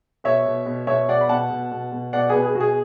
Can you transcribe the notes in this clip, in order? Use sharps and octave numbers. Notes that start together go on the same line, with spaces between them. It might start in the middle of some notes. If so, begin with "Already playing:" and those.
B2 C#5 E5
B2
B2
B2 C#5 E5
B2 D5 F#5
B5
B2 F#5 A5
B2
B2
B2
B2 D5 F#5
B2 G#4 B4
G#4
B2 F#4
G#4